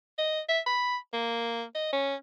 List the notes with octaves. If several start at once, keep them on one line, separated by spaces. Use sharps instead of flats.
D#5
E5
B5
A#3
D#5
C#4